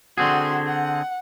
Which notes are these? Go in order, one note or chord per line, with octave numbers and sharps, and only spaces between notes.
D3 C4 F#4 G#4 C6
F#5